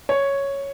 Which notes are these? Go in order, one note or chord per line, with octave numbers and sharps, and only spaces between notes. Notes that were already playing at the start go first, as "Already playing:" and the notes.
C#5